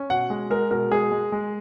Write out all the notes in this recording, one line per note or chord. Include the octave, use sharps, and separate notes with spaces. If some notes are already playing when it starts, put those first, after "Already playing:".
Already playing: C#4
B2 F#5
G#3
G#3 A#4
B2 A#4
G#3 G#4
G#3
G#3